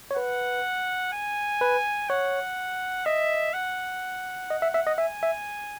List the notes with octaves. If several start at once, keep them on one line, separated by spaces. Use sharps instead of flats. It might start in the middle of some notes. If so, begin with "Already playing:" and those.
C#5
B4 F#5
G#5
B4
C#5 F#5
D#5 E5
F#5
D#5
E5
E5
D#5
E5 G#5
E5